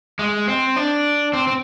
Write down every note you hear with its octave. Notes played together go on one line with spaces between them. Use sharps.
G#3
C4
D4
C4
C4